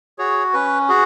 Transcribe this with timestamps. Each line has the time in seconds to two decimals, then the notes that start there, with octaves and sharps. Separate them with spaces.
0.18 F#4 G#4 C#5
0.54 C#4 B4
0.89 F#4 G#4